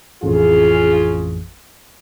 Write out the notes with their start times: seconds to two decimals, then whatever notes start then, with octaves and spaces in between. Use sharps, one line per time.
0.23 A1 F2 C#3 F4 G#4